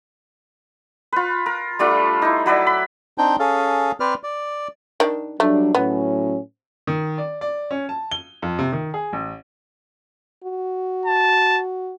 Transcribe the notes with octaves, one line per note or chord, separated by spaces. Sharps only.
F4 B4
A#4
G3 A3 D4 F4
D#4 E4
F#3 B4 D5 E5
B5
C4 D4 D#4 G5
C#4 G#4 A4 F5
C4 B4 C5 D5 F6
D5
D#3 D4
F#3 G3 A3 D4
A2 F#3 B3 C#4
D#3
D5
D5
C#4
A5
G7
F2
C3
D#3
G#4
A1
F#4
A5